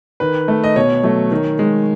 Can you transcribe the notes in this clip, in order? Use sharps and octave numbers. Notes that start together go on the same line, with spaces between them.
D#3 B4
A3
D#5
B2 C#5
F#3 A3
D#3
G#3